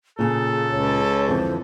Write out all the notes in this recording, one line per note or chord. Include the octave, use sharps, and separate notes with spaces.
A#2 C#3 G#4 A4
C#2 C#5
F2 D3 E3 C5